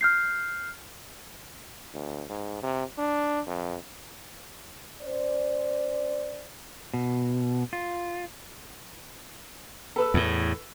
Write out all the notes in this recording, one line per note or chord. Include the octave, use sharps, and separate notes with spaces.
F6 G6 C7
D2
G#2
C3
D4
F2
C#4 C5 D5
B2
F4
A4 B4 E6
E2 A2